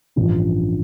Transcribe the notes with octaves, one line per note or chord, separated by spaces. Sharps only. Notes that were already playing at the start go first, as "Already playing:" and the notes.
A1 G2 F3 D4 F4